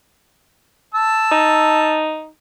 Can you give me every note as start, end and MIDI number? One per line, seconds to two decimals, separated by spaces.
0.95 2.02 81
0.95 2.02 88
1.31 2.27 63